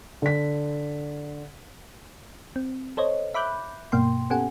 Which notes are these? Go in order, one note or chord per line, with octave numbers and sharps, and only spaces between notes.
D3 B6
C4
A4 C5 C#5 D#5
E5 B5 D6 F#6 G6
G2 B2 A#3 G5 C6
B3 C#4 G4 A4 F#5 G#5